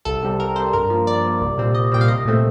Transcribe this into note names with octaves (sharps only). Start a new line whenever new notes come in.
C2 A4
C3 G3 C4
C2 A#4
C3 G3 C4 C5
G2 A#4
F3 A#3
G2 D5
F3 A#3
C2
A#2 G3 C4
C2 D#5
A#2 G3 C4 G5
F5
C2 D#5
A#2 A3 C4